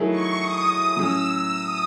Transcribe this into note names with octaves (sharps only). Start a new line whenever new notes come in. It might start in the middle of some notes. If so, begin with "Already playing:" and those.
Already playing: D#3 F#3 A3 E4 G#4
C#6
D#6
A2 F#3 C#4 E6
D#6